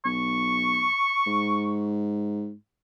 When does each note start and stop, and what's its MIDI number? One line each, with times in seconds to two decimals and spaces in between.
0.05 0.89 35
0.05 1.86 85
1.27 2.53 44